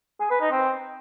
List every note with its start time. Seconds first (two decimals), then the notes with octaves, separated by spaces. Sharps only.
0.20 G#4
0.30 B4
0.41 D#4
0.51 C4